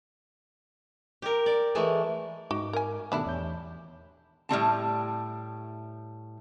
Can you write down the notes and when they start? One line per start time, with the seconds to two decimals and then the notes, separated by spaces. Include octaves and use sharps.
1.22 G4 A#4
1.46 D5
1.75 E3 G#3 A3
2.51 G#2 D#4 F#4 D6
2.73 A#4 G#5
3.12 B2 D#3 G3 A3 D4 E4
3.26 E2 C#5 G6
4.49 A2 G3 C4 A5